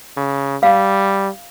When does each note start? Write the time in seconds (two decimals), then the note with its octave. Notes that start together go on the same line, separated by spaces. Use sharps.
0.17 C#3
0.63 G3 F5